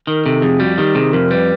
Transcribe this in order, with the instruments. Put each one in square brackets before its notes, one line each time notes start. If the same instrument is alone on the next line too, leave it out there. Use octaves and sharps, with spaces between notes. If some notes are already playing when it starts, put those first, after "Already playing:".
[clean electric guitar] D#3 [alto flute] A#4
[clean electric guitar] C3 [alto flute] A4
[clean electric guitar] F2 [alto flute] G#4
[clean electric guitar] G3 [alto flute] F#4
[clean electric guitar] D#3 [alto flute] G4
[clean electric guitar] C3 [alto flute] G#4
[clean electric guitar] F2 [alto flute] A#4
[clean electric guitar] G3 [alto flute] B4